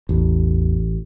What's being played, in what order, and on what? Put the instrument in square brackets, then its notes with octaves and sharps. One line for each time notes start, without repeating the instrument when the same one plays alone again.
[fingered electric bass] A1 [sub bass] E2